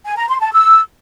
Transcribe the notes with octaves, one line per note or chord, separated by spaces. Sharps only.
G#5
A#5
C6
A5
E6